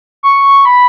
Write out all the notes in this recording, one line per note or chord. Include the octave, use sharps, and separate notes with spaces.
C#6
B5